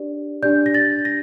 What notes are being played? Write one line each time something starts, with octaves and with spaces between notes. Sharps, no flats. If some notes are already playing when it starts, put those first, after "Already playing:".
Already playing: D4 G4 D5
D4 G4 D5 G6
A#6
A6
A#6